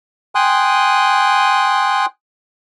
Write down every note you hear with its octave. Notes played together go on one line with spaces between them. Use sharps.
G5 G#5 C6 D#6 F#6